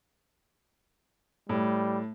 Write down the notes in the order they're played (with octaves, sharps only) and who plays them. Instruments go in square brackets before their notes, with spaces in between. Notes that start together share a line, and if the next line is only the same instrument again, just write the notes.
[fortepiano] A2 [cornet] G3